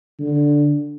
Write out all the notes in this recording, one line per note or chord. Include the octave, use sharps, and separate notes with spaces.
D3